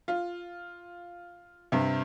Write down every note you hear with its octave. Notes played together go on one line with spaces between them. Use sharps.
F4
G2 C3